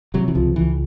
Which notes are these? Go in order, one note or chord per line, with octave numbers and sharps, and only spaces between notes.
C3 F#3
E3
C#2 F3
C#2 E3